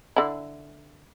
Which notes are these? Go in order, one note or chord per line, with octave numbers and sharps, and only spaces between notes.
D3 E4